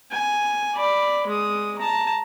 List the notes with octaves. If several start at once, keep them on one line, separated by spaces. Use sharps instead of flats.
G#5
D5 B5
G#3 D#6
A5 A#5